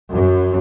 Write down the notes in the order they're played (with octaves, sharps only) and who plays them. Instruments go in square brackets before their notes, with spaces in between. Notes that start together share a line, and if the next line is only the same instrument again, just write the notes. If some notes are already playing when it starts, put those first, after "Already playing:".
[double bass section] F#2